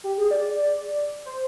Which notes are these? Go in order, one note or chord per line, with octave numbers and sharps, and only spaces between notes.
G4
G#4
D5
C5